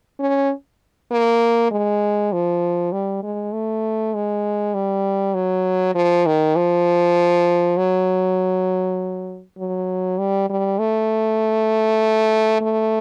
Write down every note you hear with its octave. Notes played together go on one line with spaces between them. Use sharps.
C#4
A#3
G#3
F3
G3
G#3
A3
G#3
G3
F#3
F3
D#3
F3
F#3
F#3
G3
G3
A3
A3